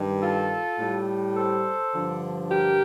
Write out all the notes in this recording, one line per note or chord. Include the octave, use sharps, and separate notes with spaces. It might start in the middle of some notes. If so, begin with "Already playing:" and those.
Already playing: G2 D#3 G3
F4 A4
A2 G3
A4 C5
G2 D3 F3
G4 A#4